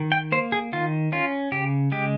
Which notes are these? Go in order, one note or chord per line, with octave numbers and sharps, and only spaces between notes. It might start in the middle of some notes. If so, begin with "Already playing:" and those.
Already playing: D#3
G5
A#3 C5
G#4
D#3 F4
C#4 F4
C#3 G4
G#3 G4